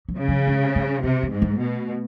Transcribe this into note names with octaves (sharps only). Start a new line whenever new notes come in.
F#3
C#3
F#3
G#3
G3
C3 B3
G#3
G#2
A3
B2